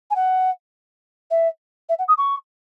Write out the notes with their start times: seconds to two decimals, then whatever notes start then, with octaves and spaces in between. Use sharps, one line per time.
0.11 G#5
0.16 F#5
1.31 E5
1.89 E5
1.99 F#5
2.08 D#6
2.18 C#6